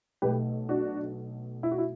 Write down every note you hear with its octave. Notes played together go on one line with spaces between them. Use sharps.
B1 B2 A3 G4 B4
D4 F#4
E4
F#4
E4